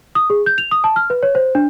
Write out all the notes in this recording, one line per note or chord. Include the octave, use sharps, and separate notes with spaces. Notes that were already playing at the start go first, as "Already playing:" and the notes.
D#6
G#4
G6
F7
D#6
A5
F6
B4
C#5
C5
D4